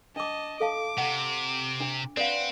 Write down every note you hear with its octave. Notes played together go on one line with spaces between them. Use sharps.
D4 D#5 A5 D6
A4 F5 A5 D6
C3 F#5
D4
C4 B4 D5 F5 F#5